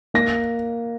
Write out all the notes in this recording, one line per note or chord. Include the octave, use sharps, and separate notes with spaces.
A#3 A#6